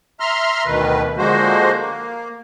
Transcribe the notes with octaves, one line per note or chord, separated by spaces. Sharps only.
E5 A#5 C6 F6
D2 B2 D#3 B4
D3 F3 G#3 A#3 F#4 C5
A#3